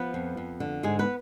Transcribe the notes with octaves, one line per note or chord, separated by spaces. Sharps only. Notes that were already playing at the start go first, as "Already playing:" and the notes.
Already playing: F3 B3 B4
F2
F2
D3
G#2 G#3 G#4
B3 B4